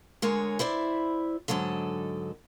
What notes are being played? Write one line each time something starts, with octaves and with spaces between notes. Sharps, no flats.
D3 G#3 G#4 A#4 C#5
E4 C5 D5 E5
G#2 D3 F#3 A4 D#5